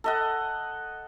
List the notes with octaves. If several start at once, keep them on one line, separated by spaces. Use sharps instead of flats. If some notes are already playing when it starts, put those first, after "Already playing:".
A4 D#5 F#5